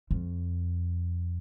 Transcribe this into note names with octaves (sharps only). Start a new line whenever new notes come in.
F2